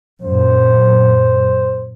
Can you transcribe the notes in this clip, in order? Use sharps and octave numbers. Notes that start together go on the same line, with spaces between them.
F#2 A#2 C5